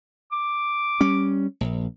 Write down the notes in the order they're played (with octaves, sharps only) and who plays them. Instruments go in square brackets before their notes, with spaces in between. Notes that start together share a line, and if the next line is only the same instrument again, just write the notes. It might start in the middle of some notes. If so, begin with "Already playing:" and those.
[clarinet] D6
[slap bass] G3 C#4
A#1